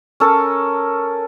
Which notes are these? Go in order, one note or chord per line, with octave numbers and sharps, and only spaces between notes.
C#4 A4 A#4 C#5